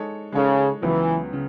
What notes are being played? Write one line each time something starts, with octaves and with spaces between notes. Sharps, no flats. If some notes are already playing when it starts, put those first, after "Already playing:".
Already playing: G#3 D#4 A4 C#5
C#3 G#3 D#4 A4 C#5
C#2 C#3 E3 F#3 B3
C#3